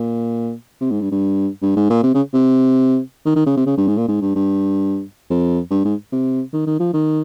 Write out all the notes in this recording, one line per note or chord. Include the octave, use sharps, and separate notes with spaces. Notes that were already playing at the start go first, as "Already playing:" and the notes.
Already playing: A#2
C3
G#2
G2
G2
G2
G#2
A#2
C3
C#3
C3
D#3
D#3
C#3
C3
C#3
G2
G#2
A#2
G#2
G2
G2
F2
G2
G#2
C3
D#3
D#3
F3
D#3